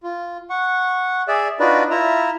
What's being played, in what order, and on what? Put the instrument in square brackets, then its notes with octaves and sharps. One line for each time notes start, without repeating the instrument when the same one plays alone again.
[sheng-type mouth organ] F4
F#5 C#6
G#4 D5 E5
D4 D#4 F4 F#4 B4 D5
E4 F4 E5 A#5